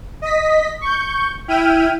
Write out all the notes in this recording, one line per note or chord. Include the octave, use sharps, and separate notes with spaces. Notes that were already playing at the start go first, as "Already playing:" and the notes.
D#5 B6
C#6 G6
E4 G5 F6 D#7